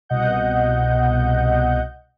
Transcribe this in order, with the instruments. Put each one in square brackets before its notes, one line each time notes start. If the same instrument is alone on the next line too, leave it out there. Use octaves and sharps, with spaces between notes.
[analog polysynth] C2 B2 D#5 F#5 G6